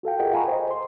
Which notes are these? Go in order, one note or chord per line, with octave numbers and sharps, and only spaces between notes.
F#4 A4 F5 G5
F4 G#4 A#4 D#5 F#5 G5
F5 G#5 A#5 B5 C#6
C5 D#5
C6